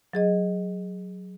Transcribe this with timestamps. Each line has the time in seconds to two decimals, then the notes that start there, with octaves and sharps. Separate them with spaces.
0.13 F#3 G#4 D#5